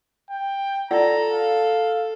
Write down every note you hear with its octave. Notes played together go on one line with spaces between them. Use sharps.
G5
F4 A4 D5 F#5 A#5
F5